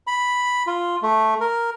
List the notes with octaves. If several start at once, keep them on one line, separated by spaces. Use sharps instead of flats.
B5
F4
A3
A#4